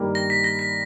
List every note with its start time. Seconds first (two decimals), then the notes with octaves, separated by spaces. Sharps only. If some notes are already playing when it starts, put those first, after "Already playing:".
Already playing: G2 D#3 G3 A#3
0.15 A#6
0.30 B6
0.44 A#6
0.59 B6